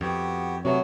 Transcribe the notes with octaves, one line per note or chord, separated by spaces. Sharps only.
F2 B3 F#4 G4
C3 F#3 A3 B3